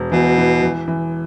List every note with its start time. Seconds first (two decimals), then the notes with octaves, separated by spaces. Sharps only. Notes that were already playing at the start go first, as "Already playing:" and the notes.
Already playing: E1
0.12 B2 E3
0.38 E3
0.62 E3
0.88 E3